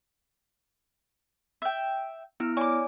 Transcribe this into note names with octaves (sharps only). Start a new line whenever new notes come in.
E5 G5
B3 E4 E6 F6
C#5 D5 G#5 C#6 D6